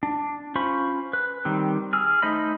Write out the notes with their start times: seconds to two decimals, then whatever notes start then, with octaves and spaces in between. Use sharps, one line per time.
0.03 D4
0.55 C#4 F4 C5 B5 C#6
1.13 B4
1.45 D#3 G3 C4
1.93 G#4 E6 F6
2.22 A3 D#4 C5 D#5 B5